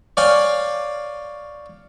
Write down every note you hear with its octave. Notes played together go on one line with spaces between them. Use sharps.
C#5 D5 F5 G5 G#5